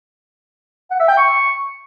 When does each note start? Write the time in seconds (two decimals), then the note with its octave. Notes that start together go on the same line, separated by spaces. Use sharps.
0.91 F#5
1.00 E5
1.08 G5
1.17 C#6